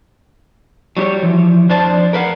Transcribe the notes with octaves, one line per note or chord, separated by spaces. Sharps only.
F#3 G3 F4 G4 C#5
E3 F3
F2 D4 C5 A5
A#4 B4 F5 F#5